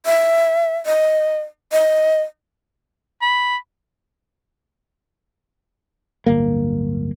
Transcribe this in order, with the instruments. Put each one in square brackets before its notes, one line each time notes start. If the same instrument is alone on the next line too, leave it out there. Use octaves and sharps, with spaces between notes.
[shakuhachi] E5
D#5
D#5
[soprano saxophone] B5
[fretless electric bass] D1 G1 A#3